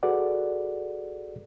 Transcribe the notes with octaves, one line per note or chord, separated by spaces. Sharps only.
F#4 G#4 A4 B4 D5 F#5